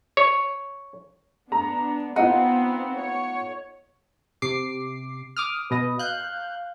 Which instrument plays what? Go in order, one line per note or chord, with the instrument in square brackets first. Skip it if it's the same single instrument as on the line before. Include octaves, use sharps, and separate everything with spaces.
[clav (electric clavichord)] C#5
[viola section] B3 D4 [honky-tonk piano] A#5
[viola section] B3 C4 [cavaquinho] D#4 [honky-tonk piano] F4 F#5
[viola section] C#5
[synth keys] C3 D6 C7
D6 D#6 F6
[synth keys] B2 D#5 D#6 [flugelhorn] B4
[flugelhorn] F5 [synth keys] F#6 G6